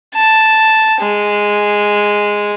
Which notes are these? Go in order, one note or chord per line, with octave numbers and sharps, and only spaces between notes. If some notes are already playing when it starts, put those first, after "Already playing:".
A5
G#3